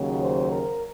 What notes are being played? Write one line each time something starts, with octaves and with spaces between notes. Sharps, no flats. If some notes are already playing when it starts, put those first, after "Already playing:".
Already playing: D#2 C#3 F#3
C5
A#4